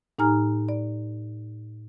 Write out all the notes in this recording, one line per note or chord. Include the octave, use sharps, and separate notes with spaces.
A2 D#4 G4 G#5 A#5 F6
D5